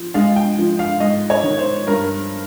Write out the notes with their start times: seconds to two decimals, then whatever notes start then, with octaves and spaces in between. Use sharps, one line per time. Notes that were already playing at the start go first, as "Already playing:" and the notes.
Already playing: F3
0.14 G#3 F5
0.36 G5
0.58 F3
0.79 F5
1.00 G#2 D#5
1.30 C#5
1.43 D#3
1.58 C5
1.87 G2 A#4